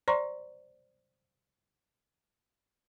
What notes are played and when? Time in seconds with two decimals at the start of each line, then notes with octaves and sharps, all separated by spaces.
0.08 C5 D5 A#5 C6 C#6